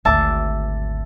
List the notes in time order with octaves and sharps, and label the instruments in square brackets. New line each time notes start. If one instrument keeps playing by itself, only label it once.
[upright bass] G#1 D2 [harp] E5 A5 D6